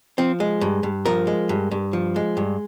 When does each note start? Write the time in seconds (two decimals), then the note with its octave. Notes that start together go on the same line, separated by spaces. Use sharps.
0.18 F3 C4
0.40 G#3
0.61 G2
0.83 G2
1.06 F3 A#4
1.27 G#3
1.49 G2
1.71 G2
1.93 F3
2.16 G#3
2.37 G2